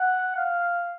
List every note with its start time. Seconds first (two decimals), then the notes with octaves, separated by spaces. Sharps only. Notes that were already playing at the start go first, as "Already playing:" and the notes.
Already playing: F#5
0.37 F5